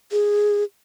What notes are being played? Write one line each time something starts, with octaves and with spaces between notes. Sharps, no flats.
G#4